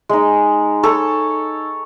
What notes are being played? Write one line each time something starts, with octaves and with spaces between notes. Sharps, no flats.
G#3 D#4
A4 C#5